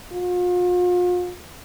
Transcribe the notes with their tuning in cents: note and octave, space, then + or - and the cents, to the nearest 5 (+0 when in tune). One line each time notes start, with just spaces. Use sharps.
F4 +40